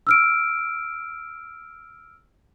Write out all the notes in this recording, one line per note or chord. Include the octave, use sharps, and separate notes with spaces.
E6 F6 D7